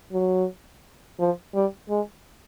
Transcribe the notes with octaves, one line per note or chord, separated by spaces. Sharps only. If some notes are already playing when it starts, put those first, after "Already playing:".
F#3
F3
G3
G#3